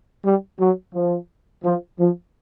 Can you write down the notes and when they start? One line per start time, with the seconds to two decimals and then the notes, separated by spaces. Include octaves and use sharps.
0.25 G3
0.60 F#3
0.94 F3
1.64 F3
1.99 F3